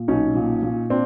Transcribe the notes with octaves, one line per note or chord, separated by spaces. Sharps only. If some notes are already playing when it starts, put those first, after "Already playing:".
Already playing: A#2
B1 C#4 D#4
A#2
A#2
C4 D4